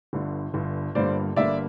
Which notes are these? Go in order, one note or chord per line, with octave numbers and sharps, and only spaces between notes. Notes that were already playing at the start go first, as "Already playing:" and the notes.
G1 G2 D3
G1 G2 D3
G1 G2 D3 G3 A#3 C5 D5
G1 G2 D3 G3 A#3 D5 E5